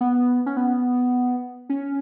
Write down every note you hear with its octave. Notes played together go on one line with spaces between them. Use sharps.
B3
C#4
B3
C#4